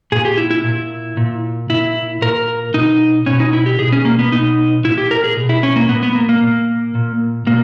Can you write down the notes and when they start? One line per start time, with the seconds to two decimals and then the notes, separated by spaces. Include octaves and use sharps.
0.12 A#2 G#4
0.25 G4
0.37 E4
0.51 E4
0.64 A#2
1.17 A#2
1.70 A#2 E4
2.22 A#2 A#4
2.74 B2 D#4
3.26 B2 C#4
3.40 D#4
3.53 E4
3.66 G4
3.79 B2 G#4
3.92 C#4
4.05 A#3
4.19 B3
4.32 B2 D#4
4.84 A#2 E4
4.98 G4
5.11 A#4
5.24 G#4
5.37 B2
5.49 E4
5.63 C#4
5.76 A#3
5.89 A#2 B3
6.03 B3
6.15 A#3
6.29 A#3
6.42 A#2
6.95 A#2
7.46 B2 A#3